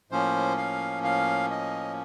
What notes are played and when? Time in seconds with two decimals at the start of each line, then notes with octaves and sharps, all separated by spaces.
0.11 A2 F3 A#3 C#4 C5
0.57 F5
1.04 F5
1.51 D#5